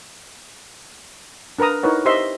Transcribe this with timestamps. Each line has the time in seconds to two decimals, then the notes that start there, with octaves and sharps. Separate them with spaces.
1.59 D4 A#4 B4 A#5 D#6
1.83 D#4 E4 A#4 B4 C#5 F#5
2.05 G4 C5 D#5 E5 C6